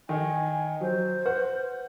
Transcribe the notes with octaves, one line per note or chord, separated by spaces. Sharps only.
D#3 D#4 G#5
F#3 C5
B4 F#5